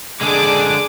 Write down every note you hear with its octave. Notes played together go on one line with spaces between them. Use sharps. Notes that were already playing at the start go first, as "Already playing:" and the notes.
D3 G#3 D4 G#4 D6